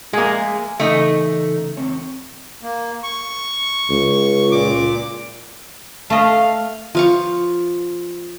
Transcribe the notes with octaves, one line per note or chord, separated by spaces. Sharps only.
G#3 A#3 G#4 A#4 E5
C#3 E3 A3 D#4
E2 C4 C#5
A#3
C#6
C#2
A#2 D6
A3 D#5 F5
F3 F5 C#6